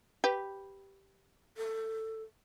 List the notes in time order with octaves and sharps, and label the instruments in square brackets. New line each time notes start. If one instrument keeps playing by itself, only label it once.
[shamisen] G4 B4
[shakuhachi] A4